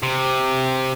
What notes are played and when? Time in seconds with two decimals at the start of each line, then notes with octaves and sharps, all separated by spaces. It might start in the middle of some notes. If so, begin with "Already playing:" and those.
0.03 C3